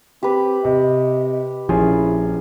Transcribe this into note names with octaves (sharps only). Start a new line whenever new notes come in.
C4 G4 B4
C3 D#5
A#1 F3 C#4 E4 G#4